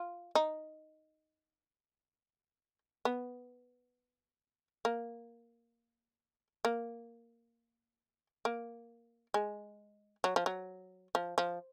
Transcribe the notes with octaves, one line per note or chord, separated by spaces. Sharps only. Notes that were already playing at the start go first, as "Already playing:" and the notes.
Already playing: F4
D#4
B3
A#3
A#3
A#3
G#3
F#3
F3
F#3
F3
F3